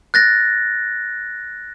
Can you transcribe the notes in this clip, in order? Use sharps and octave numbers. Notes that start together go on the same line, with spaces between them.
F#6 A6 A#6